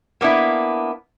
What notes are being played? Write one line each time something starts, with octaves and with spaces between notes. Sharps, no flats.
A#3 B3 D4 E4